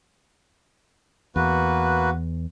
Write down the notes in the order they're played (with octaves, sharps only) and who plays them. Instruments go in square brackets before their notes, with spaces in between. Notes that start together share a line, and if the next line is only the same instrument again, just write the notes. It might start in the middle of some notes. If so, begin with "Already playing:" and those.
[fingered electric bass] E2 [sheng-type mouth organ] A#3 F#4 B4